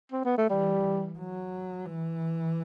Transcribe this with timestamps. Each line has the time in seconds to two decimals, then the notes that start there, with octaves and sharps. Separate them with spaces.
0.12 C4
0.25 B3
0.38 A3
0.50 E3 G3
1.19 F#3
1.86 E3